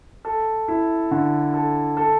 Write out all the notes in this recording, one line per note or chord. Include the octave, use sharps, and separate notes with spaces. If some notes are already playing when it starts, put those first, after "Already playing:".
A4
E4
D3
A4
A4